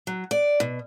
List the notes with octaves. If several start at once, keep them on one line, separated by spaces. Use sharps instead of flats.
F#3
D5
B2